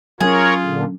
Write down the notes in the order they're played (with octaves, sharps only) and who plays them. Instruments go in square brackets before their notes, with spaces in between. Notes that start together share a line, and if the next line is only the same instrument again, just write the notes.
[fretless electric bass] F#3 C#4 [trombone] F4 [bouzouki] G#4 [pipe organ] A#4 C#5
[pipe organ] A#2 D3